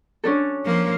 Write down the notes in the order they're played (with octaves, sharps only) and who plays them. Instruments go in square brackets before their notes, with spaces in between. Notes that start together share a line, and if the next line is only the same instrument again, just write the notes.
[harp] C#4 D4 A4
[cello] F3 A#3